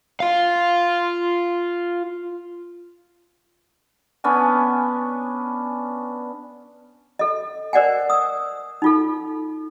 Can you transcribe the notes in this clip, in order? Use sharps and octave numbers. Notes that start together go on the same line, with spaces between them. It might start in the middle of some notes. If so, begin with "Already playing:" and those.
F4 F5
B3 C#4 D4 G#5
A4 D#5
A#4 C5 D5 D#5 F#5 G#5
D#6 E6
D#4 F4 A4